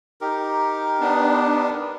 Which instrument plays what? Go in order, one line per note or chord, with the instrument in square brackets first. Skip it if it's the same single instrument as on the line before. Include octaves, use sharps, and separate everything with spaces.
[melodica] D#4 G4 A#4
[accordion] B3 D4